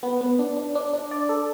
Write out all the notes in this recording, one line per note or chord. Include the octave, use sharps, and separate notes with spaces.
B3
B3
D4
D4
D4
D4
D5
A4